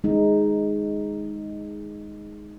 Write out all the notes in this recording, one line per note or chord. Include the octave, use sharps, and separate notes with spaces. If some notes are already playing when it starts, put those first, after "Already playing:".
G#3 D#4